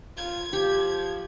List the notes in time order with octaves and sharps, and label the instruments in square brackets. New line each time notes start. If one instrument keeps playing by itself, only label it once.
[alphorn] F4 [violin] G#6
[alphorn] F3 [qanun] G4